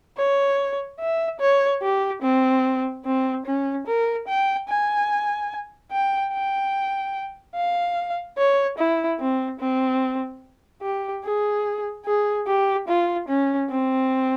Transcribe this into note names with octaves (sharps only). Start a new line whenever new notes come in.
C#5
E5
C#5
G4
C4
C4
C#4
A#4
G5
G#5
G5
G5
F5
C#5
E4
C4
C4
G4
G#4
G#4
G4
F4
C#4
C4